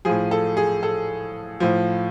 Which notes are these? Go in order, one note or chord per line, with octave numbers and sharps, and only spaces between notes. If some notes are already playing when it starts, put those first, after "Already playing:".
A2 F3 G#4
A4
G#4
A4
A2 F3